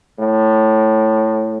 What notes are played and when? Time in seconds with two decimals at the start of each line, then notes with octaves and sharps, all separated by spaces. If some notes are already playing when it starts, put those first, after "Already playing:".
0.19 A2